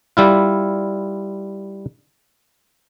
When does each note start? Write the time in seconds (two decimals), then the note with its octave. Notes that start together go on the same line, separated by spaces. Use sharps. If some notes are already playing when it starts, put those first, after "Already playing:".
0.17 G3 E4 F4